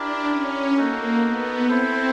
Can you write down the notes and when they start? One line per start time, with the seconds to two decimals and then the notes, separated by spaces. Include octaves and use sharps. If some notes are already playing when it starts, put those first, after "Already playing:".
Already playing: D4 E4 G4 A#4
0.30 C#4
0.77 A#3 D#4 F#4 A4
1.23 B3
1.68 C4 E4 A4 C5